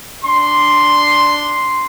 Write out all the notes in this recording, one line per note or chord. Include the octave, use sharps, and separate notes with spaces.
D4 C6